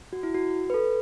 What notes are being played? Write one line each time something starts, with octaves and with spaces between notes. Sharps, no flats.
F#4
E4
F#4
B4
A4